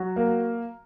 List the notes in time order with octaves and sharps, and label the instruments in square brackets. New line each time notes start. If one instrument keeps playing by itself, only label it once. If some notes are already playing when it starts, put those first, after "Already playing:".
Already playing: [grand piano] F#3 F#4
A#3